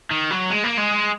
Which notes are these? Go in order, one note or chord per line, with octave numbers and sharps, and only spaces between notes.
D#3
F#3
G#3
A#3
G#3